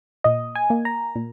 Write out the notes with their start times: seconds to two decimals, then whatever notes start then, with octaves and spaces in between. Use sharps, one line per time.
0.24 A#2 D#5
0.55 G#5
0.70 A#3
0.85 A#5
1.16 A#2